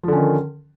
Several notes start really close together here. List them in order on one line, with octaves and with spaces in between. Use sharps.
F3 D3 C#4 D#3